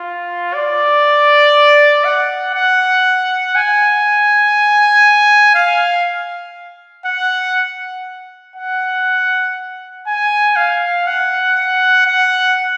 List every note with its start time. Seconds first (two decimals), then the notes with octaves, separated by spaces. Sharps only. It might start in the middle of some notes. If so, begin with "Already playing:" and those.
Already playing: F4
0.54 D5
2.04 F#5
2.55 F#5
3.55 G#5
5.55 F5
7.06 F#5
8.56 F#5
10.07 G#5
10.56 F5
11.07 F#5
12.07 F#5